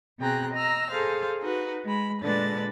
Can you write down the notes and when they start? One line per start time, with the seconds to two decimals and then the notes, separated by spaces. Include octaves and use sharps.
0.19 B2 C4 G#4 G5 A#5 F#6
0.54 D#5 A#5 E6 F6
0.89 G#4 A4 C5 F5
1.39 D#4 F#4 B4
1.85 G#3 B5
2.22 A#2 D3 G#3 D4 B4 A6